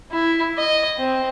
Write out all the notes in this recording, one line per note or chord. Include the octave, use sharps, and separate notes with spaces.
E4
D#5
C4